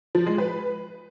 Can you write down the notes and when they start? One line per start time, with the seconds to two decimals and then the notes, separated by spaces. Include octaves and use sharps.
0.15 F3
0.26 G#3
0.38 B4